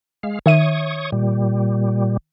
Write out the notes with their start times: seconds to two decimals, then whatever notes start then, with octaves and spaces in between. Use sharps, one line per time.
0.23 G#3 F5
0.46 D#3 C#5 E5 C#6 D#6 D#7
1.12 A#2 G3